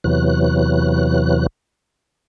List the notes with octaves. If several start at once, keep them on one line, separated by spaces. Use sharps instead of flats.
E2 C3 E3 F#3 F#6